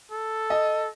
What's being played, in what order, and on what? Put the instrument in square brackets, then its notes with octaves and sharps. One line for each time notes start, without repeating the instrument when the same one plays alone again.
[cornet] A4
[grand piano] D#5